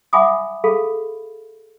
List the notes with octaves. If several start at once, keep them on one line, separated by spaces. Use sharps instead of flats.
E5 F#5 G#5 B5 D6 D#6
G#4 A4 F5 B5